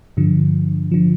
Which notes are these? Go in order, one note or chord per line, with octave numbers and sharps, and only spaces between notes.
G2 D3 F3
D3 F3